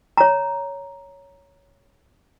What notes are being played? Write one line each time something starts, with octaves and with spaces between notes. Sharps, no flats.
C#5 A#5